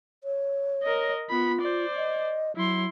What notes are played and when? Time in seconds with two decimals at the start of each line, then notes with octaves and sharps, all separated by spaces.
0.24 C#5
0.83 A#4 D#5
1.30 B3 F4 B5
1.61 C5 D5
1.96 D#5
2.56 F#3 E4 C6